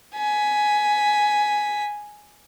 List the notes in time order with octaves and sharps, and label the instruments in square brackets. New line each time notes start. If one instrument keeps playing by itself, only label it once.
[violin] G#5 B6